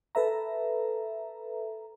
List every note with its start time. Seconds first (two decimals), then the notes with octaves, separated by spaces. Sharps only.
0.15 A4 B4 E5 A#5